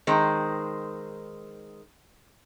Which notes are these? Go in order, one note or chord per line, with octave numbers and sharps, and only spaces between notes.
D#3 G#3 C4